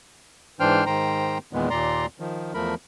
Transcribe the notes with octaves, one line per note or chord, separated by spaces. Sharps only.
G#2 E3 D4 C5 G5 F6
G#2 D#3 C5 G5 A#5
E2 A#2 D#3 G#3 B3
D#2 A#2 D5 A#5 C6
D#3 F3
E2 F3 A3 A#4 B5